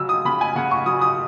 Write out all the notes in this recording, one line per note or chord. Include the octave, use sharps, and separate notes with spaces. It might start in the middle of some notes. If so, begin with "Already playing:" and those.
Already playing: C#3 F#3 E6
D#6
C#3 B5
G#5
C#3 F#5
C#6
F#3 D#6
D#6